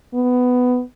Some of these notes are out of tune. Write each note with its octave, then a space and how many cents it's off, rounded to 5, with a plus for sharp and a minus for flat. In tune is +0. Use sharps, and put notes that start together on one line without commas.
B3 +10